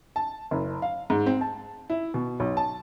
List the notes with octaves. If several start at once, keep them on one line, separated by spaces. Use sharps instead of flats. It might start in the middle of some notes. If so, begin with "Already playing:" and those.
A5
F#1
F5
G#2
C4
A5
E4
B2
B1
A5